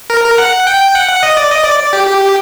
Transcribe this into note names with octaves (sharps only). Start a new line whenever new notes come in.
A#4
A#4
F#5
G5
F#5
F#5
D#5
D5
D#5
D5
D5
G4
G4